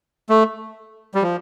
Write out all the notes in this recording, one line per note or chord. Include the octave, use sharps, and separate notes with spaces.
A3
G3
F3